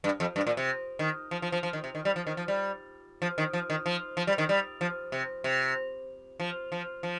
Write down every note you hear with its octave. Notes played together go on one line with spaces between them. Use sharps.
G2
F2
G2
A#2
C3
D#3
F3
F3
F3
F3
D#3
C3
D#3
G3
F3
D#3
F3
G3
F3
D#3
F3
D#3
F3
F3
G3
D#3
G3
F3
C3
C3
F3
F3
F3